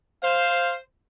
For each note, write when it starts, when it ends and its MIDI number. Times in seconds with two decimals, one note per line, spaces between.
0.23 0.78 72
0.23 0.75 77